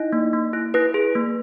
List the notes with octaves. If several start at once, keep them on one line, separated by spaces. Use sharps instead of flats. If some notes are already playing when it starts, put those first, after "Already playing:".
Already playing: D#4 E4 D#5
A#3
A#3
E4
E4 B4
G#4
A#3